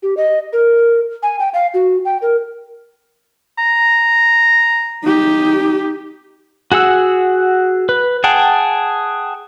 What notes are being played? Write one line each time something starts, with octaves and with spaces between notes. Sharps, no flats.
G4
D#5
A#4
G#5
G5
F5
F#4
G5
A#4
A#5
D#4 G4
F#4 G#4 F#5 E6
B4
G#4 F#5 G5 A5